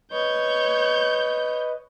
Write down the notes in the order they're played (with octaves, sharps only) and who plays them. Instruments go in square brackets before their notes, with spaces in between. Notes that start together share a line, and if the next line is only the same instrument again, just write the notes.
[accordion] B4 D#5 [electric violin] C#5 G6